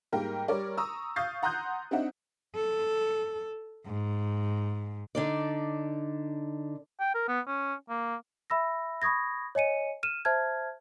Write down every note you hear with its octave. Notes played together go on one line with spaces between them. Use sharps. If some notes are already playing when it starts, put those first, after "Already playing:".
G#2 G3 A#3 A#4 G5
G3 A#4 C#5 D5
A#5 C#6 D#6 E6
F5 C#6 D#6 G6 A6 C7
F#5 A#5 C6 D#6 F#6 G6
C4 D4 D#4 E5 F#5
A4
G#2
D3 D#4 D5
G5
A#4
B3
C#4
A#3
E5 B5 E6 A#6
B5 C#6 D#6 G#6 A#6
C#5 D#5 G#5 C#7 D#7
F6 D#7 E7
C5 E5 A5 F6 G#6